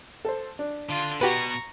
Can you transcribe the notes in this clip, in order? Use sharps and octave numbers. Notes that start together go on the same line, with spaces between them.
A4 C5
D4
D3 F4
B2 F#4 G4 B4 A#5 C#6